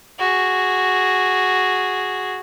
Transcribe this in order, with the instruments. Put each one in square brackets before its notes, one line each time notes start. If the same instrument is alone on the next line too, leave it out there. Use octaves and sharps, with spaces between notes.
[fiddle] F#4 G#4